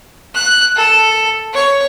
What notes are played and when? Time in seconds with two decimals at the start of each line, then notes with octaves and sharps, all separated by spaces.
0.35 F#6
0.76 A4
1.54 C#5